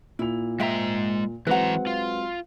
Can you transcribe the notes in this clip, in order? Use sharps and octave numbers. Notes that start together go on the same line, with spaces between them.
A#2 E4 F7
G#3 E5 G5 A#5
E3 F#3 G#3 C4 B4 F#5 A#5
F4